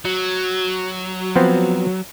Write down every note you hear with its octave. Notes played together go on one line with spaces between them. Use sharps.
F#3
F3 B3 C4